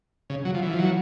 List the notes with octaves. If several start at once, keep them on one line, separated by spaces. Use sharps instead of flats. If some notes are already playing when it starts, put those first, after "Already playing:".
C#3
F#3
F3
E3
F3
F#3